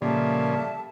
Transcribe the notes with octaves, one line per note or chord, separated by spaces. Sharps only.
A#2 C#3 F3 G3 A#3 A4 E5 A5